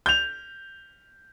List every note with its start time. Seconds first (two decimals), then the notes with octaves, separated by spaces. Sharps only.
0.06 G6 F7